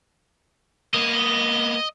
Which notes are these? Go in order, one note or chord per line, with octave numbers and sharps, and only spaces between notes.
A#3 B3 D#5